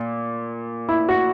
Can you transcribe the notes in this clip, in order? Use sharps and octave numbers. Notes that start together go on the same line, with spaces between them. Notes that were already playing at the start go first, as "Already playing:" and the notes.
Already playing: A#2
E4
F#4